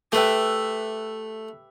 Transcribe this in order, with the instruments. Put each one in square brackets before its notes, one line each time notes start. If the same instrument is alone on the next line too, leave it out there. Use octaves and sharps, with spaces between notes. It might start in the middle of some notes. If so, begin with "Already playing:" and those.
[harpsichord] A3 [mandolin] G4 B4 E5 G5